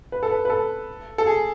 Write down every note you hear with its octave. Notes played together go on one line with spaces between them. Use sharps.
B4
A4
B4
B4
A4
A4
G#4